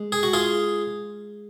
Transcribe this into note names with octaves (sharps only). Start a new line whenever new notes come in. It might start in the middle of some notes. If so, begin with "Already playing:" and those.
Already playing: G#3
G#4
F#4
F4 G#4